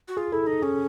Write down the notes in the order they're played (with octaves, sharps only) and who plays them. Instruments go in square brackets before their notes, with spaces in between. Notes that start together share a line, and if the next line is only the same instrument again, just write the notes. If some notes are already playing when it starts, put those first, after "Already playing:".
[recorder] F#4
[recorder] F4 [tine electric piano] G#4
[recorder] E4 [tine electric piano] A4
[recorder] D#4 [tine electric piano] A4
[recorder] C#4 [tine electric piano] G#4